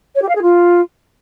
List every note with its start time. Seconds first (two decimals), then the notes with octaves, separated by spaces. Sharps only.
0.15 C#5
0.22 G4
0.29 F5
0.35 G#4
0.42 F4